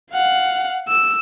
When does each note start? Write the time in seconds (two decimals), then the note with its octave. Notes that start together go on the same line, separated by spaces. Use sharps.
0.12 F5 F#5
0.88 E6